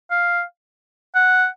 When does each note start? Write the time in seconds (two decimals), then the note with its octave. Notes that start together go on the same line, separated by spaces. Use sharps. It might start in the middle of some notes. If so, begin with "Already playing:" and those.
0.11 F5
1.15 F#5